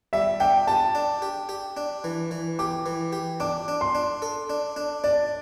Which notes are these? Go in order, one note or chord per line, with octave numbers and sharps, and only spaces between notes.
G3 E5
D4 G5
G4 A5
D4
G4
G4
D4
E3
E3
G4 D6
E3
G4
D4 D6
D4
C6
D4
A4
D4
D4
D4 D5